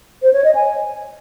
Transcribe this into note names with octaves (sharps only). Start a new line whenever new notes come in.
C5
C#5
D#5
G#5